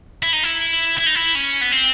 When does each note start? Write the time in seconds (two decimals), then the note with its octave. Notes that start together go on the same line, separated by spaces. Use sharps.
0.22 E4
0.33 D#4
0.43 E4
0.98 E4
1.06 D#4
1.15 E4
1.35 C#4
1.61 B3
1.72 C4